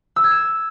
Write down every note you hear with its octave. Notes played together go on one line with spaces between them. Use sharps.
E6
G#6
E7